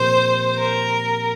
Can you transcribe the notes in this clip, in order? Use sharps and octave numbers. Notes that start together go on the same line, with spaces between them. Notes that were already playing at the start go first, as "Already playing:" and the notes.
Already playing: A#2 F3 C4 G4 A#4 C5
A#4